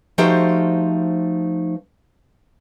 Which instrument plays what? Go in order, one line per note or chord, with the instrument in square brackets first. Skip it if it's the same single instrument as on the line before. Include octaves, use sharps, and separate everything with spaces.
[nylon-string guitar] F3 A3 D#4 F#4 G4 C5